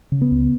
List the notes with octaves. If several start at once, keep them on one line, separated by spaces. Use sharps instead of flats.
C#3
B3
C#2